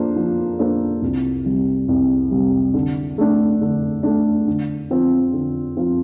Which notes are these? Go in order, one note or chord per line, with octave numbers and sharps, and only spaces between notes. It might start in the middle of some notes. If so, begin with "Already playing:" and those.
Already playing: F3 A#3 D4 A4 C5
F3
A#3 D4 A4 C5
C2
C3 G3
C2
C3 G3
D3
A3 D4
D3
A3 D4
D3
F3 C4 F4
D3
F3 C4 F4